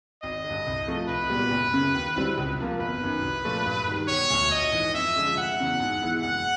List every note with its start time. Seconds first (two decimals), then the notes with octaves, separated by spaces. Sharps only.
0.23 G#1 D#5
0.44 D3
0.50 G2
0.66 C2
0.87 C3 F3 A3
1.08 C2 B4
1.30 A#2 G3 B3
1.51 F#1
1.74 F#2 C#3
1.94 D#2
2.16 D3 G3 C4 E4
2.38 C#2
2.59 C3 F3 A#3
2.80 G1 B4
3.01 F#2 D#3
3.22 C2
3.45 A#2 F3 A3
3.66 G2
3.87 D#3 G3
4.08 E1 C#5
4.30 D2 D3
4.51 A#1 D#5
4.72 G#2 E3
4.93 F2 E5
5.15 D3 F3 G#3 C#4
5.37 F1 F#5
5.59 E2 C#3 F#3
5.80 G#2
6.02 E3 G#3 B3 E4
6.22 F#1 F#5